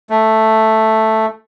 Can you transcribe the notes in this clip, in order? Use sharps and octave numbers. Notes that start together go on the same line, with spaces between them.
A3